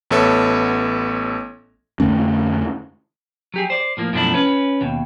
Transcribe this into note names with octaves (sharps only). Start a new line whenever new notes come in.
A1 B3 A4 C#5 E5
F2 D3 A3 C#4
F#3 G4 G#4
C5 D5
A2 F3 A#3
F#2 B2 F3 A3 D4 E4
C#4 B4
D#2 B2